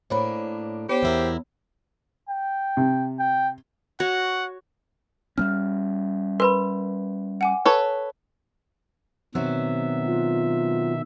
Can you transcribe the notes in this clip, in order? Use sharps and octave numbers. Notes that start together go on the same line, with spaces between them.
A2 A#3 D4 C5 C#5 B5
B3 D4 G4 C5 C#5
E2 E4 A#4
G5
C3
G5
F#4 C#5 F#5
G3 A#3 C#4 F6
A#4 B4 B5 C6
F#5 G#5 D6
A4 B4 C#5
B2 D#3 F#3 B3 C4 E5
F4